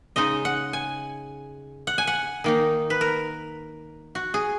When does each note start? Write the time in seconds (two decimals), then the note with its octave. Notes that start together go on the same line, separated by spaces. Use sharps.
0.16 C#3 G#3 D#4 D#5
0.45 F#5
0.73 G#5
1.87 F#5
1.98 G#5
2.07 F#5
2.44 D#3 A#3 D#4
2.90 B4
3.01 A#4
4.15 F#4
4.34 G#4